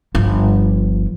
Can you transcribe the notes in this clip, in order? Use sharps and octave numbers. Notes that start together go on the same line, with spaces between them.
G1 F3